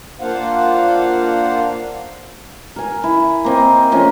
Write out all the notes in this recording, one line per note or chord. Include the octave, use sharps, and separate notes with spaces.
A#3 D4 F4 C5 F5 F#5
A#4 G#5
E4
A#3 C4 D#5
F3 A3 A#3 C#4